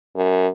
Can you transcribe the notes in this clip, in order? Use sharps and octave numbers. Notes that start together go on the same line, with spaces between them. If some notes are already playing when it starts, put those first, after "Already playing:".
F#2